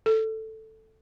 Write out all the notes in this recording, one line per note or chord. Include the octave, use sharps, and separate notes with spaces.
A4